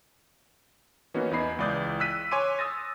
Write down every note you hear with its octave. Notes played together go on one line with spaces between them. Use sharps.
E3 A#3 B3 C#4 D#4 F#4
E2 E4 D#5 B5 C7
C#2 E3 D5 D#6 G6
E6 F#6 B6 D#7
C#5 G#5 C6 D6 D#7
D#6 E6 A6 A#6